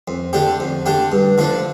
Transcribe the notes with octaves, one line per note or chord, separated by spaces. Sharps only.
F2
D3 A3 D4 G4
F2
D3 A3 D4 G4
G2
D3 F3 A3 D4